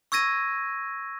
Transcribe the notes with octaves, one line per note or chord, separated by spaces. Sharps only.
C#6 E6 G#6 A#6 D#7